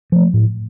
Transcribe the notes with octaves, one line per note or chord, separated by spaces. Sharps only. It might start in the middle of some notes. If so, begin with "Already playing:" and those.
F3 A3
A2